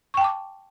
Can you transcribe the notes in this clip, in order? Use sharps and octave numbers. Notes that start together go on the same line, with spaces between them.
G5 A5 C#6 D6